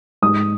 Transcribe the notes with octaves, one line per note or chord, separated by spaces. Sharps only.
G#2 D#6